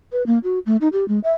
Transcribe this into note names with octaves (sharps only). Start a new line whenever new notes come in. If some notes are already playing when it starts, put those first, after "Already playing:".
B4
A#3
F#4
A3
D#4
G4
G#3
E5